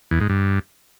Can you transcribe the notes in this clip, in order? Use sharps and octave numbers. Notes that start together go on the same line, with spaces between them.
E2
G#2
G2